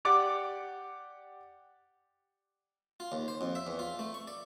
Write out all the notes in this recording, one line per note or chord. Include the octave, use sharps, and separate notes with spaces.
G4 D5 F#5 D6
F4
D#2
C5
F2
E5
E2
F4
A3
C#6
D5